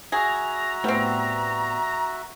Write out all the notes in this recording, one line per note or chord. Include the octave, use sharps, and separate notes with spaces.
F#4 G#4 E5 A#5
A2 G3 B3 C4